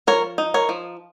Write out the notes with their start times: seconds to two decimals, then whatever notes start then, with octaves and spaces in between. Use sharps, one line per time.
0.07 F3 A#4 C#5
0.38 D#4
0.54 A#4 C#5
0.69 F3